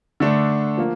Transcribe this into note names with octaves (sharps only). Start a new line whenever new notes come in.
D3 A3 D4
F3 A#3